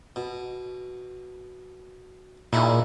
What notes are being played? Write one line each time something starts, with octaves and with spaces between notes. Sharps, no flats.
B2
A#2 D#4 E4 G#4